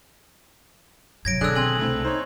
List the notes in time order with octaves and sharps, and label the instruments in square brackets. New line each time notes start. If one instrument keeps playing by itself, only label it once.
[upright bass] G2 C3 [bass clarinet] F#3 [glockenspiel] G#6 A#6 D7
[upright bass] B2 D#3 [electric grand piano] D3 G#4 D5 [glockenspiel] E6 F#6
[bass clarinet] C4 [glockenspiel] G#5 F#7
[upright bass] C2 [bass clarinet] A3 [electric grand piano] C4 E4 A4
[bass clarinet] D#4 [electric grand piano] C5 C#5